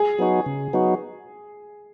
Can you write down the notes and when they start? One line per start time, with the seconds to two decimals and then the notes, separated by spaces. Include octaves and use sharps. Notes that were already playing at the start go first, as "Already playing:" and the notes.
Already playing: G#4
0.19 F#3 B3 D#4 F#4
0.46 C#3
0.73 F#3 B3 D#4 F#4